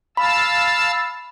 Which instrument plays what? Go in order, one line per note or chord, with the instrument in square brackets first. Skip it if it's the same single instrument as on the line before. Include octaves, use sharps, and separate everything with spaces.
[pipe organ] F5 A5 E6 [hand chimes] B5